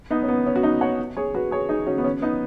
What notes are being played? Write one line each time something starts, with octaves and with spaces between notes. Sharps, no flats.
B3 D#4
C#4
B3
C#4
F#4
B3 D#4
C#5 F#5
G#4 C#5
F#4 B4
G#4 C#5
D#4 G#4
C#4 F#4
B3
C#4
B3 D#4